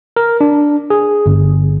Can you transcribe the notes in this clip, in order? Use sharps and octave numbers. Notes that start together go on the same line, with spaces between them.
A#4
D4
G#4
G1